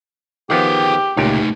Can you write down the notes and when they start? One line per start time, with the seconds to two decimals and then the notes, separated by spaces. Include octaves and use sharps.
0.50 D#3 F3 B3 G4 G#4 G5
1.17 C#2 A#2 A3 D#4 G4